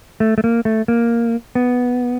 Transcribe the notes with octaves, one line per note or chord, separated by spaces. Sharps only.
A3
A3
A#3
A3
A#3
B3